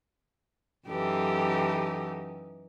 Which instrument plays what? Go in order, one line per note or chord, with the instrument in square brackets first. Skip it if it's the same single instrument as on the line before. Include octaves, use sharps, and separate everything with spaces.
[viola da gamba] F#2 E3 D#4 [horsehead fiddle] G4 A4